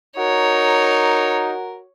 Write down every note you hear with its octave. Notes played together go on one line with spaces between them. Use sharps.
D#4 F#4 A#4 C#5